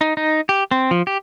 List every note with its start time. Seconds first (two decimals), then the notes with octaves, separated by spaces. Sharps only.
0.01 D#4
0.17 D#4
0.49 G4
0.71 C4
0.91 F3
1.07 G4